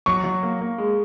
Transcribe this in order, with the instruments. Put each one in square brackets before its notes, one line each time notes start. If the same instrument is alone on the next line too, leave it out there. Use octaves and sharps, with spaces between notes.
[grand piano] F#3 [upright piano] C#6
[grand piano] F#3
A#3
A#3
G#3